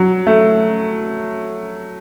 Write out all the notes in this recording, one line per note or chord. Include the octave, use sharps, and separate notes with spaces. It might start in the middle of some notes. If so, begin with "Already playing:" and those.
Already playing: F#3
A3